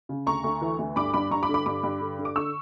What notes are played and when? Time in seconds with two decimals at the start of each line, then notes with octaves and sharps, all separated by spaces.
0.09 C#3
0.26 D2 A#5 C#6
0.44 D2
0.61 E3
0.79 D2
0.96 G2 B5 D6
1.13 G2 B5 D6
1.31 G2 A#5 C#6
1.43 B5 D6
1.49 D3
1.54 B5 D6
1.66 G2 B5 D6
1.83 G2
2.01 D3
2.19 D3
2.25 D6
2.36 D3 C#6 E6